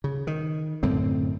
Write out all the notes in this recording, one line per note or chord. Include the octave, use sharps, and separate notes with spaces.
C#3
D#3
F#2 A2 D3 C4